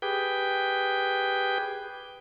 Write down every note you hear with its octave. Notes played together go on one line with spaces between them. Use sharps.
G4 G#4 B4 G5